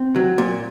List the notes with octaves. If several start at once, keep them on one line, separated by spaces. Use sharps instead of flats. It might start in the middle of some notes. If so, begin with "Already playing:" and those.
Already playing: C4
F#3
A#2